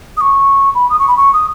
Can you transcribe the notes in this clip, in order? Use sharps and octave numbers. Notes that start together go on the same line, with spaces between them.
D#6
C#6
B5
D#6
C#6
B5
C#6
D#6